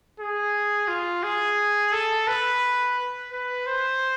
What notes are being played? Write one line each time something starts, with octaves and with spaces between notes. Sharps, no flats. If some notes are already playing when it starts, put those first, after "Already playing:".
G#4
F4
G#4
A4
B4
B4
C5